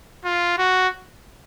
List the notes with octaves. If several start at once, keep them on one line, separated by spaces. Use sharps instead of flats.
F4
F#4